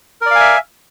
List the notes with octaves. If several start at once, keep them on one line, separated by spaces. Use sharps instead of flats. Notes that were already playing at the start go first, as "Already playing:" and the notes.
A#4 D5 E5 F5 G#5